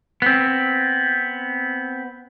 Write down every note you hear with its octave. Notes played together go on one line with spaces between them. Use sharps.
B3 C4